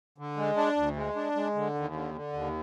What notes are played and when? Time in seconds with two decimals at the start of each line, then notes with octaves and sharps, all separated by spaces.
0.18 D3
0.37 G#3
0.57 D4
0.77 D2
0.96 G#3
1.16 D4
1.35 G#3
1.55 D3
1.74 D#2
1.94 D3
2.14 D3
2.33 D#2